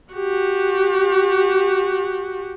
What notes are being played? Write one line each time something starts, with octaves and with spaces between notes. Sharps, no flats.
F#4 G4